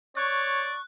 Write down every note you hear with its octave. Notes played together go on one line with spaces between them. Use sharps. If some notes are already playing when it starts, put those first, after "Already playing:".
C#5 D5 C#6 F#6